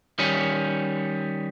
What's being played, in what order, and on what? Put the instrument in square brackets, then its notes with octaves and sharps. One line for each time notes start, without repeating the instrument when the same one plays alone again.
[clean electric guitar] D#3 G3 C#4